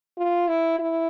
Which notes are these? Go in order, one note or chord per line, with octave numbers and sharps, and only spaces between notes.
F4
E4
E4